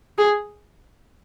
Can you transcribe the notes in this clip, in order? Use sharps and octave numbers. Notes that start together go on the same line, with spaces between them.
G#4